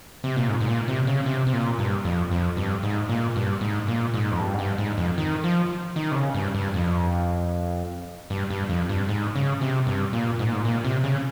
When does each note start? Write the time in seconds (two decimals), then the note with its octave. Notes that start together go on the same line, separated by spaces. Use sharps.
0.24 C3
0.36 A#2
0.48 G#2
0.60 G#2
0.68 A#2
0.88 C3
1.07 C#3
1.26 C3
1.47 C3
1.53 A#2
1.79 G2
2.05 F2
2.31 F2
2.57 G2
2.83 G#2
3.09 A#2
3.36 G2
3.61 G#2
3.88 A#2
4.14 G#2
4.31 F2
4.40 G2
4.54 G#2
4.59 G2
4.78 G#2
4.98 F2
5.18 D#3
5.44 F3
5.96 D#3
6.11 C3
6.15 C#3
6.35 G2
6.55 G2
6.74 F2
8.30 G2
8.50 G2
8.69 F2
8.89 G2
9.09 G#2
9.35 C#3
9.61 C3
9.87 G2
10.13 A#2
10.39 G#2
10.47 A#2
10.54 G#2
10.65 A#2
10.85 C3
11.04 C#3